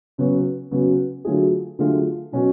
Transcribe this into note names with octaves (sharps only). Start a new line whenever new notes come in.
C#3 F#3 B3 F#4
C#3 F#3 B3 F#4
D3 F#3 A3 F4 G#4
D3 F#3 A3 F4 G#4
B2 F#3 C#4 F#4